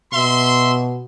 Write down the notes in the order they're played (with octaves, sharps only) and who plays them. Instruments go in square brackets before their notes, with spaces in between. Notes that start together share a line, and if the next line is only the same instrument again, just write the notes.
[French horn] B2 [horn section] E5 C6